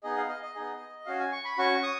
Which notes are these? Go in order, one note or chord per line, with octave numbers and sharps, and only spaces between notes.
B3 D#4 G#4 D#5
F5
D#5
D#5
B3 D#4 G#4
C#4 F#4 F5
G#5
C#6
B5
C#4 F#4 C#6
D#6